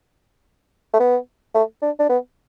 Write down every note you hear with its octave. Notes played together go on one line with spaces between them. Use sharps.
A3
B3
A3
D4
D4
B3